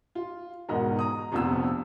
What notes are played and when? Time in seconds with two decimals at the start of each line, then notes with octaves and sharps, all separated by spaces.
0.15 F4
0.69 E1 G#2 B3 F#4 A#4 D#5
0.99 A#5 D#6
1.32 F1 A#1 F2 B3 F4 E6